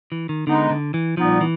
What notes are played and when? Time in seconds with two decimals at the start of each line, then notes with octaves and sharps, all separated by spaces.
0.12 E3
0.29 D#3
0.47 D3 G#3 B3 D#4
0.70 D3
0.94 E3
1.17 A#2 F3 G3 B3 D#4
1.41 E3